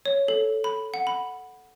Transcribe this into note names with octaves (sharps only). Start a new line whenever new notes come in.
C#5
A4
B5
F#5
B5